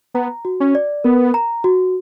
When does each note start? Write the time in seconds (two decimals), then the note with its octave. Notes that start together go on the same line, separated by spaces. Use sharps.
0.14 B3 A#5
0.45 F#4
0.60 C#4
0.75 D5
1.04 B3 A#4
1.34 A#5
1.64 F#4